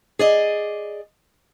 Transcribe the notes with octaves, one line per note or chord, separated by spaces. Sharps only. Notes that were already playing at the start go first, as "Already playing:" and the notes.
G#4 D5 D#5